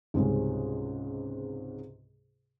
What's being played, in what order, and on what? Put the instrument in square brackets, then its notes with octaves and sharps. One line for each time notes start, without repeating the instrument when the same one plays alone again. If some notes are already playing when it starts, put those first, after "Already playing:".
[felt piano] C#2 G#2 C3 G3 G#3 C#4